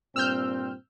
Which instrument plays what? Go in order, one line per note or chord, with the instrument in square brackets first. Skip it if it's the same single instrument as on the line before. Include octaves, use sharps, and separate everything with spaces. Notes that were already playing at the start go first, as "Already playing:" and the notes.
[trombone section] G2 A#2 C4 [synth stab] E6 F6 G6